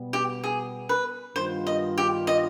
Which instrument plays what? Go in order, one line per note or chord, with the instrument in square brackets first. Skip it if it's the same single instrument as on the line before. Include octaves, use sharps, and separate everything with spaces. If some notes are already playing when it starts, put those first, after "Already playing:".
Already playing: [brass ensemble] B2 G3 B3
[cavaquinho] G4
G#4
B4
[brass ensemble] G2 D#3 B3 F4 [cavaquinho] C5
[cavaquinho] D#5
G4
D#5